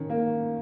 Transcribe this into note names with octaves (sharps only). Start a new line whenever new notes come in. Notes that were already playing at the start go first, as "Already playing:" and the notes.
Already playing: D#3 C#4
A#3